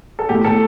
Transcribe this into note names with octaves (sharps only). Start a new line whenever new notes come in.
A4
A2 G4
A2 A4